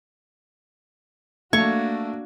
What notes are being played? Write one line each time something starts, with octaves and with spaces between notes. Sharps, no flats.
A3 A#3 D4 F#4 C#6 G#6